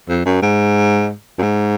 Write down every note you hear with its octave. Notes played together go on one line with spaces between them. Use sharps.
F2
F#2
G#2
F#2
G#2